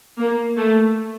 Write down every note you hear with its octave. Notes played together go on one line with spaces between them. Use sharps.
A#3
A3